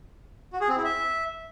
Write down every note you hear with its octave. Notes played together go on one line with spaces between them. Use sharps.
F#4
G#4
C4
E4
E5